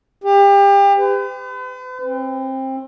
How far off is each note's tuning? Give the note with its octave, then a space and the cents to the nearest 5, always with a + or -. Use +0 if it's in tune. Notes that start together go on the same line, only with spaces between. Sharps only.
G4 +30
B4 +45
C4 +25